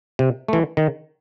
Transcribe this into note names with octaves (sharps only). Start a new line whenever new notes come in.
C3
E3 A3
D#3